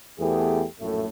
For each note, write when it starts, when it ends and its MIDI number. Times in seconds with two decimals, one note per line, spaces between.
0.19 0.65 40
0.19 0.65 57
0.19 0.65 59
0.19 0.65 67
0.19 0.65 68
0.80 1.07 34
0.80 1.07 42
0.80 1.07 45
0.80 1.07 57